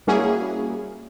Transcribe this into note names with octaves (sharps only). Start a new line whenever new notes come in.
G3 A#3 C#4 E4 F#4 G#4